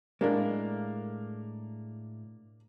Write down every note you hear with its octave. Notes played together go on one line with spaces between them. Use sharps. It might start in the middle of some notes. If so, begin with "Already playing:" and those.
A2 G#3 A#3 D4 A#4